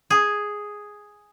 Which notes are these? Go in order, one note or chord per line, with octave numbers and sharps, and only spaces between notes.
G#4